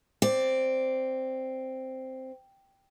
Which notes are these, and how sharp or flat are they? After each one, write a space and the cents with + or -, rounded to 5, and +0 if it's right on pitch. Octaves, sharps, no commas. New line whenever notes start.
C4 +0 D5 +0